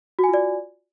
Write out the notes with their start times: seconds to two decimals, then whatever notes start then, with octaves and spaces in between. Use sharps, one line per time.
0.19 F#4
0.24 G#5
0.29 F4
0.34 D5